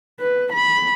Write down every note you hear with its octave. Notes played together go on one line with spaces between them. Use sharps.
B4
B5